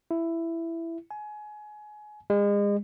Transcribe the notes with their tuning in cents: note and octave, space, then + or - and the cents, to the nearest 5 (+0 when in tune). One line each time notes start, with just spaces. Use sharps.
E4 +10
G#5 +25
G#3 -35